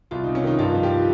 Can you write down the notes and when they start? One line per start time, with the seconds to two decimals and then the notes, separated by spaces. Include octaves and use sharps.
0.11 C2 F4
0.24 D#4
0.28 C3
0.35 C#4
0.44 D#3 D#4
0.59 G2 F4
0.74 F3
0.83 G4